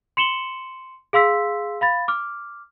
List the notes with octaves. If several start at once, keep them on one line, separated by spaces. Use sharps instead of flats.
C6 C#7 E7 F#7 G7
G#4 F5 C6 E6 B6
F5 B5 A6
D6 F6